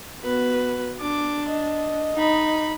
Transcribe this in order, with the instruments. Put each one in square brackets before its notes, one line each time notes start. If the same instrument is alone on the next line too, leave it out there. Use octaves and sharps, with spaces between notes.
[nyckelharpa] B3 F#4 [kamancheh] B4
[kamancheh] D4 [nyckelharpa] D6
[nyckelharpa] D#5
[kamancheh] D#4 B5